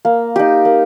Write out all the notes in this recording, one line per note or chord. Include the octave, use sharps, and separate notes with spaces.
A#3
D#4 G4
A#3